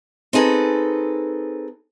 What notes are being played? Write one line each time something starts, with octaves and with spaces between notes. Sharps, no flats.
C4 D#4 G#4 A4 B4